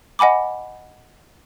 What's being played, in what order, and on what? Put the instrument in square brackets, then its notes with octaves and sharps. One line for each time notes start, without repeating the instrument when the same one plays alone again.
[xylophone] D#5 F#5 G#5 B5 D6